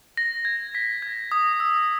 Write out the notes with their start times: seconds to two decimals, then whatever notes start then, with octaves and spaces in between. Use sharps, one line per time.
0.17 A#6
0.45 G#6
0.75 B6
1.02 G#6
1.32 D#6
1.60 E6